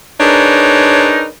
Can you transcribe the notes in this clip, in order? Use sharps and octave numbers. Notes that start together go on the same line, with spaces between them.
D4 D#4 G#4 A#4 B4 C#5